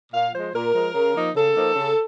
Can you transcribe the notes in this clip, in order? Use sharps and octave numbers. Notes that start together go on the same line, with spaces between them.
A#2 F5
F3 G#3 C5
A#2 A#4
F3 G#3
C#3
F3 A#3 D#4
C#3 A4
F3 A#3 D#4
C#3